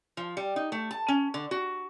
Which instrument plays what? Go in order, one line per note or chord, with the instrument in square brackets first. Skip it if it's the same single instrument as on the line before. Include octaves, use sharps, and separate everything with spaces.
[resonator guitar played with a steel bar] F3
G3
D#4
A3
A5
C#4
D3
F#4